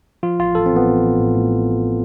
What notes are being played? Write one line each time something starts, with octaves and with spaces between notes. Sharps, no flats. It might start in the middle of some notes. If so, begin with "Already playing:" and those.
F3 F4
A1 F4
A1 A4
C4
A1 B3
A1
A1
A2
A2